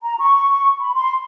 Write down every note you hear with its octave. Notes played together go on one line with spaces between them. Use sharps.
A#5
C#6
B5
C6